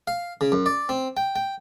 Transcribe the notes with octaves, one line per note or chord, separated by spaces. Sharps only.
F5
C#3
F#2
D5
C4
G5
G5